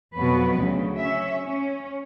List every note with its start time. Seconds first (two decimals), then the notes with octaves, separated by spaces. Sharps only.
0.16 F2 B2 F#3 B4
0.58 D2 C#3 F#3
0.96 C#4 E5
1.44 C#4